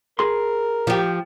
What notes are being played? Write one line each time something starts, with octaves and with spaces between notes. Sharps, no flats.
G#4 A#4 C6
F3 G4